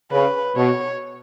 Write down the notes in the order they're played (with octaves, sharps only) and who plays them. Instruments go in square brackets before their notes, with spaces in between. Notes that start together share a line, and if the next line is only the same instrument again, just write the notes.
[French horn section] C#3 [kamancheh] B4
[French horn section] B2 [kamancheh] C#5